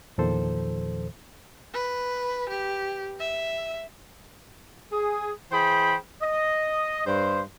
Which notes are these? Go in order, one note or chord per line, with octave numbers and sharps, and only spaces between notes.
E2 A#2 D#3 F3 A4 C5
B4
G4
E5
G#4
E3 G#4 C5 G5 B5
D#5
G2 C5